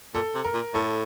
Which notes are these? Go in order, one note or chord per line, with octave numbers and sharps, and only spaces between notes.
A#2 A4
C3
A#4
A#2
A2 A4